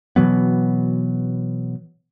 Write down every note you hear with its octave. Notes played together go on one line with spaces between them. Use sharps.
B2 E3 F#3 B3